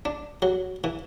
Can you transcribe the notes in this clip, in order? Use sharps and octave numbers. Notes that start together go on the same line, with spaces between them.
D4
F#3
E3